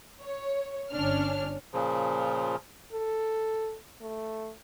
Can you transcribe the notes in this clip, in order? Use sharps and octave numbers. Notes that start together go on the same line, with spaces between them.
C#5
G1 C#4 D4 F6
A#2 C#3 F3
A4
A3